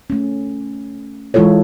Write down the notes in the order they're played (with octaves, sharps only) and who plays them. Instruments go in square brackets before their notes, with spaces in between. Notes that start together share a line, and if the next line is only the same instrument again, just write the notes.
[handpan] A3 C#4
E3 G#3 E4 F4 A4 C#5